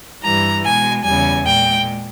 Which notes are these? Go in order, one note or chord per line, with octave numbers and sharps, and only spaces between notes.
G2 E3 G3 A#5
B2 G#3 G#5
E2 C#3 G3 G#5
A#2 G#3 G5